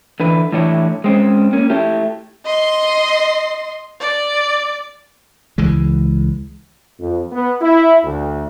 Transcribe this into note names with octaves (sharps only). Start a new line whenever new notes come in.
D3 E3 B4
A2 E3 G3 D4 E4 C#5
G#3 C4 C#4
A#3 C#4
A3 E4 G4
D#5 C6
D5
C#2 E3 G#3
F2
B3
E4
D2